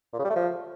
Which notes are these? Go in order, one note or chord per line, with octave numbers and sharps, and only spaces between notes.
A#2
C#3
G3
A3
F3